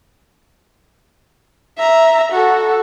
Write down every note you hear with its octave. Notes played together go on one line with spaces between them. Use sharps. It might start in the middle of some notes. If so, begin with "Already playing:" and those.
E5 A#5
F#4 A4